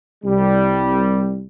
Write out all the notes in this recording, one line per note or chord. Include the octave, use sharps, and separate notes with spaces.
C2 G3